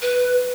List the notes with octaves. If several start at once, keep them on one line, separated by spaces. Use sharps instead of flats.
B4